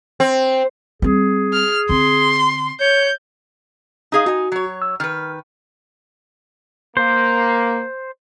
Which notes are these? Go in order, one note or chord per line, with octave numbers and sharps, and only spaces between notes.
C4
G3 C4 G#4
F6
D3 C4 C6
C#5 G6
D#4 G#4 F5
D#4 F#4 G#5
F#3 C#5
E6
D#3 B4 F6
A#3 C5